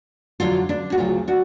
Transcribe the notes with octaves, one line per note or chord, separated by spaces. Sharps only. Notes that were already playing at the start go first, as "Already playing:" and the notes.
F2 D3 F#3 F4
D4
F#4
D2 C#3 F#3 F4
D4 F#4